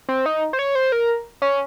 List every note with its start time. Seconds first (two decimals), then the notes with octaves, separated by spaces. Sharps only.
0.09 C4
0.26 D#4
0.53 C5
0.59 C#5
0.75 C5
0.92 A#4
1.42 C#4